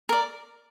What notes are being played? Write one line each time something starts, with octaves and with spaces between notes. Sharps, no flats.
A#4 D5